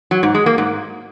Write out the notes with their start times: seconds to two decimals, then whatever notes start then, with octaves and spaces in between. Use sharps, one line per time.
0.11 F#3
0.23 G#2
0.35 G#3
0.46 A#3
0.58 G#2